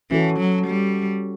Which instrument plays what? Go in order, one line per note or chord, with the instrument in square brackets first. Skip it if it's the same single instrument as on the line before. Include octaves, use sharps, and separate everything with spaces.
[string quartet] E3 [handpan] C#4 F#4 A4
[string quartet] F#3
G3